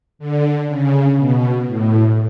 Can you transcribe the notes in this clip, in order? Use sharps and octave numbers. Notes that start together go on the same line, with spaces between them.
D3
C#3
B2
A2